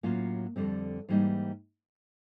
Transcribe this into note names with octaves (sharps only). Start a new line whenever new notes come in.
A2 F#3 A#3 C#4 F4
F2 D3 G3 C4
G#2 E3 G3 A#3 D#4